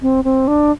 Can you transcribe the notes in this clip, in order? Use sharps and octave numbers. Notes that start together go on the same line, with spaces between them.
C4
C4
D4